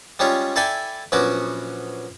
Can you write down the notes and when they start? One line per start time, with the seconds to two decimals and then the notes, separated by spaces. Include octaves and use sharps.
0.19 G3 G#3 C#4 F4 C#5
0.56 E4 A4 D5 E5 G5 G#5
1.12 A#1 F#3 B3 C#4 F#4 D6